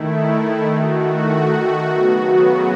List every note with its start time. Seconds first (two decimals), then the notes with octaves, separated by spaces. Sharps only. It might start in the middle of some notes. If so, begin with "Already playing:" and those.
Already playing: D#3 A3 E4
0.75 F#4
1.86 C#3 F#3 B3